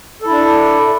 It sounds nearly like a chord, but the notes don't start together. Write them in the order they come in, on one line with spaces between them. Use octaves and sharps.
A4 E4 D4